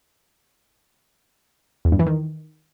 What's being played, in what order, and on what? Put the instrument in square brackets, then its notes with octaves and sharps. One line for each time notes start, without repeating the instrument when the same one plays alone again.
[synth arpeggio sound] E2
G2
E3
D#3